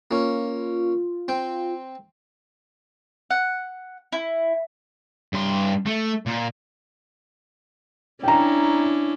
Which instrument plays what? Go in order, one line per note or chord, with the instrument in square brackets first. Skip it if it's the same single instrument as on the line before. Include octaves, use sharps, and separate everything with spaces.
[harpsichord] A#3 C#4 [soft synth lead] F4
[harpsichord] C4 G5
[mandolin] F#5
E4
[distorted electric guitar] G2 C6
A3
A#2
[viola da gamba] C#4 D4 E4 [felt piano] G5 A#5